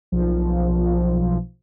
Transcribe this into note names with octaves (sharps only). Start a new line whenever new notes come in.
B1 F3